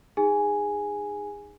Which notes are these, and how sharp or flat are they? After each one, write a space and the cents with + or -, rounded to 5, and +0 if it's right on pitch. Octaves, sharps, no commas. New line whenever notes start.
D#4 +0 G#4 -20 G#5 +0